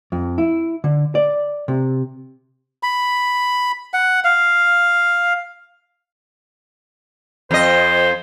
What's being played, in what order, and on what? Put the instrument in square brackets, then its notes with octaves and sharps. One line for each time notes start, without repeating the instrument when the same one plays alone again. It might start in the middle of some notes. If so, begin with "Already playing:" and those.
[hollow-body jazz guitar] F2
E4
D3
D5
C3
[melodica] B5
F#5
F5
[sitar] F2 D#5 [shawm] C5